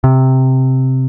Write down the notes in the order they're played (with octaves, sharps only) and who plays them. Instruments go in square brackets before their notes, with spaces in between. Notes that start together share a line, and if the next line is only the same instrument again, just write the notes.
[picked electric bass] C3